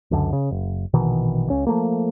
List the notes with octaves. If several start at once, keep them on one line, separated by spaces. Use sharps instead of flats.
C#2 F#2 D3
C#3
F#1
A#1 B2 D#3 E3
C#2 C#4
F3 A3 A#3